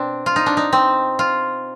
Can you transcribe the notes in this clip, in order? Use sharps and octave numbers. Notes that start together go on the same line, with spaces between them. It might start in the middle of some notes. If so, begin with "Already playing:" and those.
Already playing: B2 C4 D4
F4
D#4
D4
D#4
C4
F4